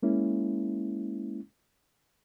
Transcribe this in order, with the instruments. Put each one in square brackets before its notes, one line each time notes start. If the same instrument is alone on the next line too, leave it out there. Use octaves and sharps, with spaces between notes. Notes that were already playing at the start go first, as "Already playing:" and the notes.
[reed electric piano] G#3 A#3 C#4 E4